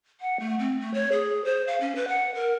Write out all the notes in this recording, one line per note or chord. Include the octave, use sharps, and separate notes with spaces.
F#5
A3
C4
A3
C#5
G#4
C5
F5
C#4
B4
F#5
A#4